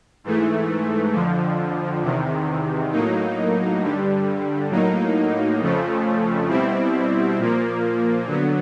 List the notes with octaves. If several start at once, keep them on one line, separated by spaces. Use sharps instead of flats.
G#2 E3 A3
F2 D3 F3
E2 C3 D#3
A2 F#3 A#3 D#4
G2 D3 G3
A2 F#3 A#3 D#4
F2 C#3 F3 A3
B2 G3 C4 E4
A#2 F3 A#3
D3 F#3 B3